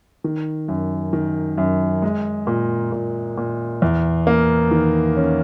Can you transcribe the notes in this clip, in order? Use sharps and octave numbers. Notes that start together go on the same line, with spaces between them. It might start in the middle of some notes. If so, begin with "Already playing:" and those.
D#3
F#2
D#3
F#2
G#3
A#2
A#2
A#2
E2
A#3
D#3
C#4